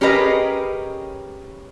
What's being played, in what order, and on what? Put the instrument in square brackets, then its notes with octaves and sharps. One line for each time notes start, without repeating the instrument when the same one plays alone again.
[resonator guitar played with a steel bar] C#4 G4 G#4 A#4 B4 D#5